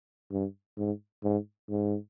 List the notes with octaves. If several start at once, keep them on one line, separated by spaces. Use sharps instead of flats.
G2
G#2
G#2
G#2